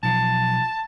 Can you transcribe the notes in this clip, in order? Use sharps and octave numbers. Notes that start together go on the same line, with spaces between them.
B1 F3 A5